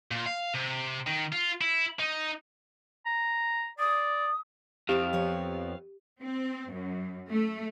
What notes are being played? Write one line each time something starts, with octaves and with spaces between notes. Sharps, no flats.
A#2
F5
C3
D#3
F4
E4
D#4
A#5
D5 D#6
F2 C4 E4 G4 C5 F5
F3 B3 C#5
C4
F#2
A3